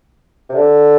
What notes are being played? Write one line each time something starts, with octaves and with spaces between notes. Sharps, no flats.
C3
D3